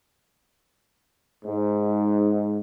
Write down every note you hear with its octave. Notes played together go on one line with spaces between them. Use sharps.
G#2